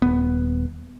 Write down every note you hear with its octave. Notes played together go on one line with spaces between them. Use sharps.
D#1 B3